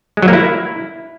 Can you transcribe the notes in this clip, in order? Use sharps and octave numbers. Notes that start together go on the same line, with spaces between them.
G#3
F#3
A#3
E4